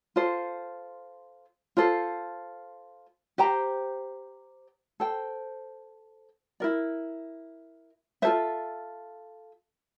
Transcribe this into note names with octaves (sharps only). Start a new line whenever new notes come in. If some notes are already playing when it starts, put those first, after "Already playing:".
F4 A4 C5
F4 A4 C5
G4 C5 G5 A#5
A4 C5 G5
E4 A#4 D5
F4 A4 C5 E5